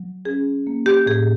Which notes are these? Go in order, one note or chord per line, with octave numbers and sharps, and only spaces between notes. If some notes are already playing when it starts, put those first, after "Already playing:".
Already playing: F#3
C#4 G#4
A#3
G4
A2 G#4